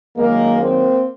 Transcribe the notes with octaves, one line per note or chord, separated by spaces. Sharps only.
F#2 D#3 F#3 G#3 A#3
A#3 C4